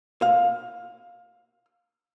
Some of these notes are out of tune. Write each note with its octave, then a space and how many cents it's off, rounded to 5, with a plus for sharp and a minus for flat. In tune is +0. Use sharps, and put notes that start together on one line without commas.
F5 +20